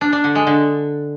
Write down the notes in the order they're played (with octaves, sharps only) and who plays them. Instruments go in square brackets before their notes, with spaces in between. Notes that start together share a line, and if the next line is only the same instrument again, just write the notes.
[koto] D4
D4
D3
G#3
D3